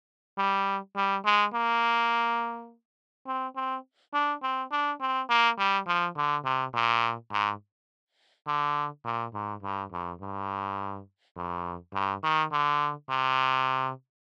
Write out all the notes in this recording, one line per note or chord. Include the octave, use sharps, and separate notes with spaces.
G3
G3
G#3
A#3
C4
C4
D4
C4
D4
C4
A#3
G3
F3
D3
C3
A#2
G#2
D3
A#2
G#2
G2
F2
G2
F2
G2
D#3
D3
C3